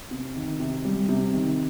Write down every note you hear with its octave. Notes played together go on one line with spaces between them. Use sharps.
C3
D#3
C3
G3
C3
D#3